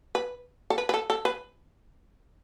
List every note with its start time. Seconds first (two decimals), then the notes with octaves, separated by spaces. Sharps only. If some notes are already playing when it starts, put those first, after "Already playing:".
0.15 B4
0.70 A4
0.78 B4
0.89 B4
0.94 A4
1.10 A4
1.25 B4